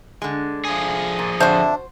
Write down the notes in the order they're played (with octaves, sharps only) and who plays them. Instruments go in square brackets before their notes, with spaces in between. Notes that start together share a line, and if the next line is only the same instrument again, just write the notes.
[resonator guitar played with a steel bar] D3 G#3
[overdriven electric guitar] F3 G#4
[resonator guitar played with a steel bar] A#2
[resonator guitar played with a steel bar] F2 D3 E5 [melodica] D4 [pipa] F#4 C5